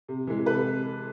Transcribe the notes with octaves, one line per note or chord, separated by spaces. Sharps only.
C3
E3 G#3
C3 A4 B4